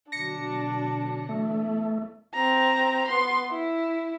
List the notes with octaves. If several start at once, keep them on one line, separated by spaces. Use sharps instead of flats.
B2 D3 F#3 D4 A#6 C#7
E3 A3 B3
C4 A#5
B3 C6
E4